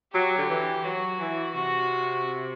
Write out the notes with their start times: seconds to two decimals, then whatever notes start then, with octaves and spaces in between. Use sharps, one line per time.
0.13 F#3 G4
0.37 D3
0.50 E3
0.84 F#3 F#4
1.19 E3
1.55 C3 F#4